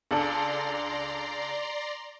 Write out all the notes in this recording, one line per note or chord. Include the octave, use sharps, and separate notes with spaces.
C#2 D4 A4 D5 A#5 C6